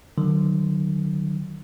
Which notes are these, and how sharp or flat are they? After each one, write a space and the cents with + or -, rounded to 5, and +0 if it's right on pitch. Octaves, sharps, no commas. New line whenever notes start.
D#3 -45 F#3 +10